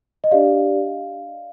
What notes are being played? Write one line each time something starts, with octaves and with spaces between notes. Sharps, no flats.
D#5
D4 G4 D5 F5